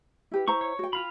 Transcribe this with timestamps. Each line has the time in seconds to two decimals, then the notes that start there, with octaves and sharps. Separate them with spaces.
0.31 E4 G4 B4
0.48 E4 C5 A#5 C#6
0.61 C#5
0.79 F#4 G5
0.93 F4 F5 B5